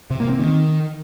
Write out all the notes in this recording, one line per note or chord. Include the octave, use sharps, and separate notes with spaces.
C3
A#3
C4
D#3